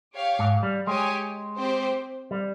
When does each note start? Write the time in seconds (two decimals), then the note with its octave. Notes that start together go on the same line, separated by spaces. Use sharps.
0.15 G4 C#5 F5
0.39 G#2
0.63 G3
0.87 G#3 G4 C#5 G#5
1.58 C4 G4 C5 G5
2.31 G3